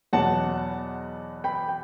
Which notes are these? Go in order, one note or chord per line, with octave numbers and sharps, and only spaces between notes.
E2 B2 F#3 F#5 A5
G5 B5
G5